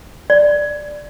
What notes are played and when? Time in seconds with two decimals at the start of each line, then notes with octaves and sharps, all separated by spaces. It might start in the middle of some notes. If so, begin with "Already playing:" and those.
0.30 D5